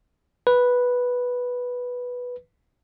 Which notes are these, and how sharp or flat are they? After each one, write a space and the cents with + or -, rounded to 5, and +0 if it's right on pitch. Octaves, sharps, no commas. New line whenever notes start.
B4 -5